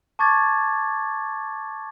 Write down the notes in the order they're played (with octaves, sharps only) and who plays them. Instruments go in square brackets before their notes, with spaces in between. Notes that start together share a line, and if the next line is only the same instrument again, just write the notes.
[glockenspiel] A5 C#6 D6 G#6 A6